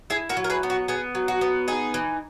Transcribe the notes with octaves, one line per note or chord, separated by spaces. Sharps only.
E4 G#4
F#4 A#4
F#3
A#4
G#4 B4
B3
F#4
B3 G#4
F#3
F#4
B3
D#4 G#4
E3